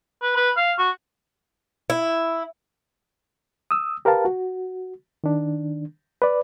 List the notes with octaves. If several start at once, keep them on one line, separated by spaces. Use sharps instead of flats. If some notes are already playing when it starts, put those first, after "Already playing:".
B4
B4
F5
F#4
E4
D#6 E6
G4 A#4 B4 F5 A5
F#4
D#3 D4
B4 D5